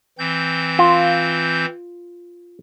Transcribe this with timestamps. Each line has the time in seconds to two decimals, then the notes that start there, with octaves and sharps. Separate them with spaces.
0.19 E3 C4 G6
0.79 F4